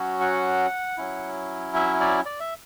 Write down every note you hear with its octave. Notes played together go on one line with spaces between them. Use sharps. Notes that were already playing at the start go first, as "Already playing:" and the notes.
Already playing: F#3 C#4 F#4
F#5
F#3 C#4 E4
E5
D5
D5
E5